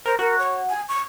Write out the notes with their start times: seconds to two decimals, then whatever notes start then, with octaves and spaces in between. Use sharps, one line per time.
0.06 A#4 C5
0.19 F#4 A#4
0.38 C#5
0.69 G#5
0.89 C#6